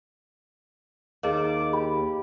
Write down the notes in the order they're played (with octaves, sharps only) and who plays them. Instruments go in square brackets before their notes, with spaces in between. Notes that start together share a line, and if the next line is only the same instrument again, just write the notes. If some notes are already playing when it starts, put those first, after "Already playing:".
[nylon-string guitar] D#2 [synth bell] G#4 D#5 F5 [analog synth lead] D6
[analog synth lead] G4 [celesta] B5